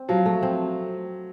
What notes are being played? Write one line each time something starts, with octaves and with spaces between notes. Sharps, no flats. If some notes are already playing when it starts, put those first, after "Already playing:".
Already playing: C4
F3 F#3
A3
C4